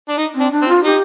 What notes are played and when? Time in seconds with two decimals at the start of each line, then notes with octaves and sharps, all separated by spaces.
0.09 D4
0.18 D#4
0.35 C4
0.40 D4
0.51 D4
0.62 C4
0.68 F4
0.84 D#4 G4